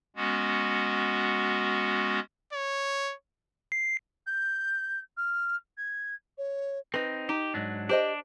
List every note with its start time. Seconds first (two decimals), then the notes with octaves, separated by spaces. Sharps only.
0.16 G#3 B3 C#4 F#4
2.53 C#5
3.72 C7
4.27 G6
5.17 F6
5.78 G#6
6.38 C#5
6.94 C4 D#4 B4
7.29 D#4 G4
7.54 G#2 F#3 D4
7.89 D4 G4 C5 D#5